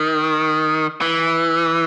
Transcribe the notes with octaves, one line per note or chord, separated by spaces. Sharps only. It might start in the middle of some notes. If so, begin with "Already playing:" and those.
Already playing: D#3
E3